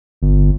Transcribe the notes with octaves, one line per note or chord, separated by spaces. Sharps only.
G1